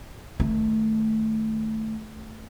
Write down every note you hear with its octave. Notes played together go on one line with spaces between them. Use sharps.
D#3 A3